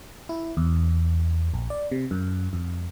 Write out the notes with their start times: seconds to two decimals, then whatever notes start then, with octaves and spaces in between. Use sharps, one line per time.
0.29 E4
0.57 E2
1.54 A#1
1.70 D5
1.92 C3
2.11 F#2
2.53 F2